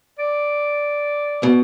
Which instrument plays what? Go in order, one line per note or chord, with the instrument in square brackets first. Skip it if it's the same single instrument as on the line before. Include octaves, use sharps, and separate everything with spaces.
[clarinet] D5
[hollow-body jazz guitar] B2